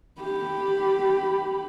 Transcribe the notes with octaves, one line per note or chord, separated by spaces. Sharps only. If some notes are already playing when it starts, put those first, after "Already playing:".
G4 B5